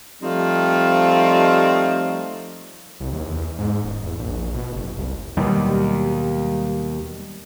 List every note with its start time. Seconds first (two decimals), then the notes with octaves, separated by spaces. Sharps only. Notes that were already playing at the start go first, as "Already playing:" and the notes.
0.22 F3 G3 A3 C4 D#4 F4
3.00 C2
3.12 D#2
3.26 E2
3.58 G#2
3.84 D#1
4.04 E2
4.19 A#1
4.54 B2
4.72 F#1
4.98 C2
5.37 D#2 B2 F#3 G3